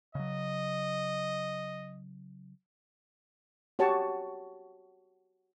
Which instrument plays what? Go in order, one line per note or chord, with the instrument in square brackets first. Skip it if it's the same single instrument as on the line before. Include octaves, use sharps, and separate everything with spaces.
[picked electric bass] C#3 F#3 [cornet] D#5
[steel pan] F#4 G4 C#5 A5 C#6